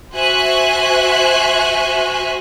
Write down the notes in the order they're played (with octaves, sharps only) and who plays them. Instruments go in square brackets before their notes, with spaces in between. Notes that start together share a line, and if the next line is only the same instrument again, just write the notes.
[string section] F#4 C5 E5 G#5 C#6 F#6